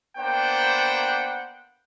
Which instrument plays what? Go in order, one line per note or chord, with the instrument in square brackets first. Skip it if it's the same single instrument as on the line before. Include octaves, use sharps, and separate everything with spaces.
[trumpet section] A#3 B3 D4 C5 F#5 G5